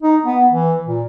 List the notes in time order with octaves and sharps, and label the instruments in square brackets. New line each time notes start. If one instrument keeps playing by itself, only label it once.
[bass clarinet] D#4
B3
E3
A#2